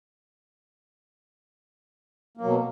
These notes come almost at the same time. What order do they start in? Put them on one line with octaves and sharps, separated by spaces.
A#3 F#3 B2